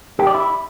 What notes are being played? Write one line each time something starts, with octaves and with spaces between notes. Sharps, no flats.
G4
D5
E4